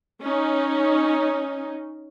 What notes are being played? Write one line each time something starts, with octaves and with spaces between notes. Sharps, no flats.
C#4 D#4